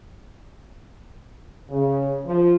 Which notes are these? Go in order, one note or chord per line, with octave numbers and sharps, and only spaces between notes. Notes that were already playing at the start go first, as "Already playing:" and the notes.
C#3
F3